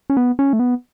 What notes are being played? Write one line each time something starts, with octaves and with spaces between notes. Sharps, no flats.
C#4
B3
C#4
A3
B3